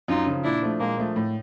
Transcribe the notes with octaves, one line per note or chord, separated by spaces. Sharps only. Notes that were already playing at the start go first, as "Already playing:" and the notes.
F#2 D#4 F4
C#3 F3
A#2 D4 E4
F3 A3
A#2 G#3 A#3
F3 A3
A2